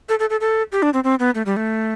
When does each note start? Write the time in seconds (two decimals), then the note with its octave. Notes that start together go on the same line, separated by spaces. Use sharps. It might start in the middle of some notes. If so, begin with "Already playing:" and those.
0.09 A4
0.19 A4
0.30 A4
0.41 A4
0.72 G4
0.82 D4
0.93 C4
1.04 C4
1.19 B3
1.35 A3
1.46 G3
1.57 A3